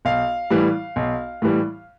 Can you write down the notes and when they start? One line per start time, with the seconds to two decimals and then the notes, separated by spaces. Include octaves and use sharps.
0.05 B1 F5
0.50 A2 E3 G3
0.96 B1
1.42 A2 E3 G3